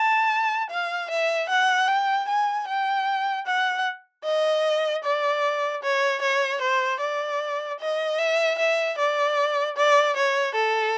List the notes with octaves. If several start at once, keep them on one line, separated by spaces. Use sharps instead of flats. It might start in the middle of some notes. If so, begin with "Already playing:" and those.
Already playing: A5
F5
E5
F#5
G5
G#5
G5
F#5
D#5
D5
C#5
C#5
C5
D5
D#5
E5
E5
D5
D5
C#5
A4